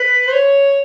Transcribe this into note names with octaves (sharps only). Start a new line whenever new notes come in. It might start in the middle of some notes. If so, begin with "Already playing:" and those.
Already playing: B4
C5
C#5